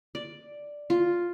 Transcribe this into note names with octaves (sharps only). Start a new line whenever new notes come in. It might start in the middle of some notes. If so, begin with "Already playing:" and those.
D5
F4